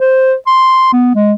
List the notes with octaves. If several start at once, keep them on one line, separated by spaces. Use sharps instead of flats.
C5
C6
B3
G#3